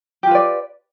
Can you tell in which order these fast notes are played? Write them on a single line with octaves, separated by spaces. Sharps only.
G4 F4 B4 D5